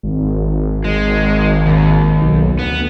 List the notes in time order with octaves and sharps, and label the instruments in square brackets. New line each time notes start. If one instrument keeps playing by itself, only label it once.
[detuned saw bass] G#1
[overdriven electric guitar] G#3
D#2
[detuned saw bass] B1
[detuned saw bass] D2 [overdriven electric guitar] B3